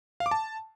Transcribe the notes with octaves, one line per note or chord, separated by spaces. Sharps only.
F5
D6
A5